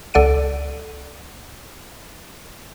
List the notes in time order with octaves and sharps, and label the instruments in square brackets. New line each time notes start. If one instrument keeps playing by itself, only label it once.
[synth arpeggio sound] C#2 A4 D5 F#5 D7 D#7